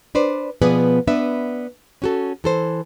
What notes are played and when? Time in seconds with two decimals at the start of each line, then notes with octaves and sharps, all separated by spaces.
0.15 D4 B4 C5 D5
0.62 B2 F3 B3 G#4 B4 D5
1.07 B3 D4 B4 E5
2.02 C#4 F#4 A4
2.44 E3 A4 C5